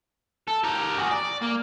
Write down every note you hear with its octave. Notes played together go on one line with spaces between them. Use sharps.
A4
G4 A#4
F#4 G#4
D5
A#3